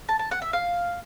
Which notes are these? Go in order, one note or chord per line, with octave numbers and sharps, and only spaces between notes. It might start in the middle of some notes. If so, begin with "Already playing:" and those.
A5
A5
F#5
E5
F5